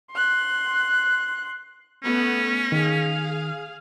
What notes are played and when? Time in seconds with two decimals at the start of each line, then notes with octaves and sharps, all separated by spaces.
0.11 C6 F#6
2.03 A3 B3 C#4
2.72 D#3 G#4 F5